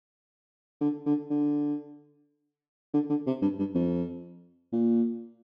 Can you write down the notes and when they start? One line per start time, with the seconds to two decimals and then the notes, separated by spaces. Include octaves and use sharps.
0.81 D3
1.06 D3
1.30 D3
2.94 D3
3.09 D3
3.27 C3
3.42 G2
3.59 G2
3.75 F2
4.73 A#2